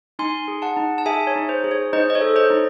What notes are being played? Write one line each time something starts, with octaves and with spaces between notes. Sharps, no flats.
D#4 G#5 C6
G#4
F#5 A5
D#4
A5
G#4 E5 G#5
C#5
D#4
C5
G#4
C#5
D#4 C5 D#5
D#5
C#5
A4
C5 D#5
D#4